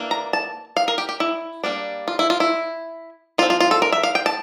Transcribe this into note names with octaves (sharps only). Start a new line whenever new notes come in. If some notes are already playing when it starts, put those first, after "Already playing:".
Already playing: E3 A#3 D4
A#5
A5
F5
A#4
G4
G4
E4
G3 A#3 D4
F4
E4
F4
E4
F3 C4 F4
F4
F4
A4
A#4
E5
F5
G5
A5